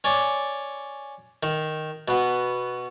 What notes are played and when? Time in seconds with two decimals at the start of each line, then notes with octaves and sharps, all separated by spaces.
0.04 C#4 D5
1.43 D#3
2.08 B2 B3